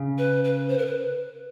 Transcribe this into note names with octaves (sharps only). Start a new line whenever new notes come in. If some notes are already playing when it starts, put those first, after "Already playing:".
Already playing: C#3
B4
B4
C5
A#4
B4